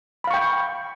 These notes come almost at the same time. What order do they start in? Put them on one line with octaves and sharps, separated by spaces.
B5 F5 C#6 G5